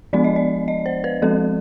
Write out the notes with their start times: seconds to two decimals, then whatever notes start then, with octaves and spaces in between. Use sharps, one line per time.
0.13 F3 G#3 B3 D4 D5
0.24 D#5
0.36 D5
0.68 D#5
0.86 C5
1.04 B4
1.22 F3 G#3 C4 A4